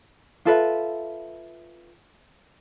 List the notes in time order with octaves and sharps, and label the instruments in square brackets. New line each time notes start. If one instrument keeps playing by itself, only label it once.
[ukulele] F4 A4 B4 E5